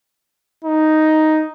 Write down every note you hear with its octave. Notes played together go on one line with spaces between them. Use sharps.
D#4